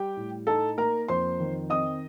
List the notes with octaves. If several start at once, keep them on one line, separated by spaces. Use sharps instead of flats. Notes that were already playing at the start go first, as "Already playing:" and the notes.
Already playing: G3 G4 G5
A2
D#4 A4 A5
A#3 A#4 A#5
F2 C5 C6
D#3
C4 D#5 D#6